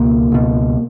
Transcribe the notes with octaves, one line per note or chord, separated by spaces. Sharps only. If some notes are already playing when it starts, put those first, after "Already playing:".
Already playing: C#2 B2 A#3
C#2 B2